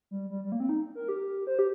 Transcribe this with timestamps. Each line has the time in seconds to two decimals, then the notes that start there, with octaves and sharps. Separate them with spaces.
0.11 G3
0.30 G3
0.44 G3
0.52 A#3
0.60 C4
0.69 D#4
0.95 A#4
1.09 G4
1.47 C5
1.59 G4